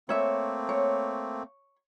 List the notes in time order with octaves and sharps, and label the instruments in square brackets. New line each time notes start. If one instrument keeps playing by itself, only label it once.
[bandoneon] A3 A#3 C4 [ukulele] C#5 E5
[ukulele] C#5